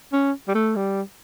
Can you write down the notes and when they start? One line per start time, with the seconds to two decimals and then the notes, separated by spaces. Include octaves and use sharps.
0.13 C#4
0.48 G3
0.55 A3
0.76 G3